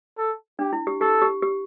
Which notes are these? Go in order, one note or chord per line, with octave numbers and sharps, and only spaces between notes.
A4
D4 G4
E4
G4
G4 A4
G4
G4